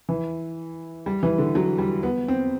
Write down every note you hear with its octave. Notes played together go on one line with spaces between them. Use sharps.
E3
G3
E3
D3
F#3
G3
B3
C4